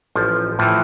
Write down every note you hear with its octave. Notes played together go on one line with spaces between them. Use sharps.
A1 F3
A2 E3 F3